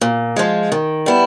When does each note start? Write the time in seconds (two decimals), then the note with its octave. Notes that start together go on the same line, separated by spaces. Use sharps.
0.01 A#2
0.36 F3 G#3
0.72 D#3
1.06 G3 B3 E4